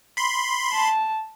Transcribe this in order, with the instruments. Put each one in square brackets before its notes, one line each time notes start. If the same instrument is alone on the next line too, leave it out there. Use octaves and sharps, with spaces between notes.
[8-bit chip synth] B5 C6
[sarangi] A5